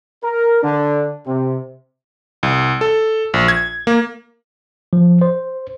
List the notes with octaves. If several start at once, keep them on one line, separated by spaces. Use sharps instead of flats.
A#4
D3 D4
C3
C2
A4
A#1
G#6
A#3
F3
C5